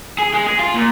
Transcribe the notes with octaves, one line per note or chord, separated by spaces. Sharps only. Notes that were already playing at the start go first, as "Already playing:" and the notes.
G#4
G#3
G#4
F4
A#2